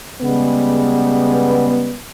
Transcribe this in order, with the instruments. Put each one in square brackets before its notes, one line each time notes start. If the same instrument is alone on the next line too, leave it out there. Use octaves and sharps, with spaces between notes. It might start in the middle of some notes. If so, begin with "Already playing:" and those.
[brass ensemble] C#3 G3 G#3 B3